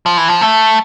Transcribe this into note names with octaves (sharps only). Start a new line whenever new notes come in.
F3
E3
F3
A3